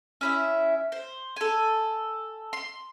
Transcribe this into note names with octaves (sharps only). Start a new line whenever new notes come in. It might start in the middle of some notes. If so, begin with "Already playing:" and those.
C#4 E4 E5
C5
A4 G#5
C6